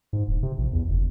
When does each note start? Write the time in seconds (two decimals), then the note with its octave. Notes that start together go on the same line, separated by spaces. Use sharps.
0.13 G#2
0.28 D1
0.43 C3
0.58 A#1
0.73 E2
0.89 F#1